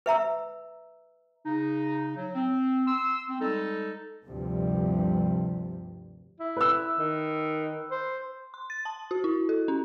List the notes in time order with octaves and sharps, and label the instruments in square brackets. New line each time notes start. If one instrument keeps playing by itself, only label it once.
[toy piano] B4 E5 A#5 E6
[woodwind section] C#3 D#4
F#3
C4
C6 E6
C4
G3 G#3 D#4 A4
[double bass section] D2 G2 C3 F3 G3
[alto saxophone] E4
[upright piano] B4 E6
[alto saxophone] D#3
C5
[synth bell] C6
A6
A5
F#4
E4
A4
C#4